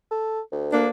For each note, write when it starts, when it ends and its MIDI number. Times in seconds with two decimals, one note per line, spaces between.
0.11 0.40 69
0.52 0.88 38
0.72 0.89 58
0.72 0.89 62